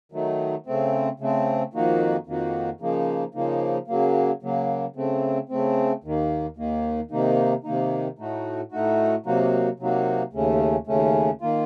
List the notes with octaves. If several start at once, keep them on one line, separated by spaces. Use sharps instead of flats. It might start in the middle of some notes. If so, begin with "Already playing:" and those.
D#3 F#3 A3 D#4
C#3 A3 C4
C#3 A3 C4
F2 D#3 A#3 D#4 F#4
F2 D#3 A#3 D#4 F#4
C#3 F3 A#3 D#4
C#3 F3 A#3 D#4
C#3 F#3 A#3
C#3 F#3 A#3
C#3 A3 C4
C#3 A3 C4
D#2 D#3 A#3
D#2 D#3 A#3
C3 D#3 A#3 D#4
C3 D#3 A#3 D#4
A2 A3 D#4 F#4
A2 A3 D#4 F#4
C3 F#3 A#3 D#4 F#4
C3 F#3 A#3 D#4 F#4
D#2 C#3 A3 C#4
D#2 C#3 A3 C#4
D#3 A#3 F4